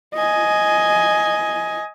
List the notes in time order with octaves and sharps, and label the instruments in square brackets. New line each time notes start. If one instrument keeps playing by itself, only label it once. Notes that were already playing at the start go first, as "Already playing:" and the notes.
[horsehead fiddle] D#5 G#5